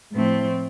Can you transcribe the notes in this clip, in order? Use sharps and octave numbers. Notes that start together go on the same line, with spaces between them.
A2 F3 A3 C4